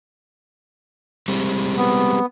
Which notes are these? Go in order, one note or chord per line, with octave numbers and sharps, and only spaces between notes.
G3 G#3 C4
B3